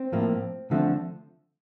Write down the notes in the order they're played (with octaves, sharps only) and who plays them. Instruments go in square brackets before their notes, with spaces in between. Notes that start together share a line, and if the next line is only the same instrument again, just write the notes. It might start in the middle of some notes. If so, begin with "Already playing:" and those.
Already playing: [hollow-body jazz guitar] C4
A2 F3 A#3
D3 F3 A3 C4